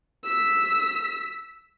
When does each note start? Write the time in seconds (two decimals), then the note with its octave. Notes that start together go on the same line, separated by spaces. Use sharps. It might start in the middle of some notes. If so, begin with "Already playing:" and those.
0.24 E6 B6